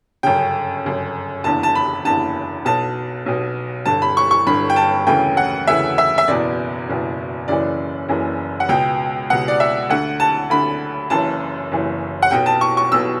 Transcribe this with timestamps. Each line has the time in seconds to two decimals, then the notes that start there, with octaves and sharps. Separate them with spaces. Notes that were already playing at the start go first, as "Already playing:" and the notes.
0.23 G1 F#2 C#3 G5
0.85 G1 F#2 C#3
1.44 F#1 E2 D3 A5
1.63 A5
1.75 B5
2.05 F#1 E2 D3 A5
2.65 B1 B2 A5
3.26 B1 B2
3.86 G1 G2 D3 A5
4.02 B5
4.17 C#6
4.31 C#6
4.47 G1 G2 D3 B5
4.70 G5
4.76 A5
5.06 E1 D2 C#3 E3 G5
5.37 F#5
5.67 E1 D2 C#3 E3 E5
5.98 E5
6.18 E5
6.28 F#1 E2 B2 D5
6.88 F#1 E2 B2
7.48 F#1 F#2 C#3 E3 D5
8.09 F#1 F#2 C#3 E3
8.60 F#5
8.69 C#2 B2 G5
9.30 C#2 B2 F#5
9.48 D5
9.60 E5
9.89 D2 D3 F#5
10.20 A5
10.50 D2 D3 B5
11.10 F#1 F#2 E3 A5
11.72 F#1 F#2 E3
12.22 F#5
12.31 B1 B2 G5
12.46 A5
12.61 C#6
12.77 C#6
12.92 B1 B2 E6